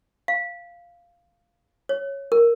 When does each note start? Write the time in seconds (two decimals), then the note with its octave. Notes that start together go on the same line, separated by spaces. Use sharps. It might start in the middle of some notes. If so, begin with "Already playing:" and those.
0.28 F5
1.89 C#5
2.32 A#4